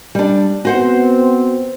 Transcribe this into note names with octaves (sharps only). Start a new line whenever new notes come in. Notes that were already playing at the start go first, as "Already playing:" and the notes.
G3 D4
B3 C4 F#4 C5 F#5